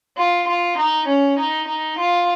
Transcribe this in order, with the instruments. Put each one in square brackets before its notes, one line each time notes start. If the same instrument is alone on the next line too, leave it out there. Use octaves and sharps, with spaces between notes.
[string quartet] F4
F4
D#4
C#4
D#4
D#4
F4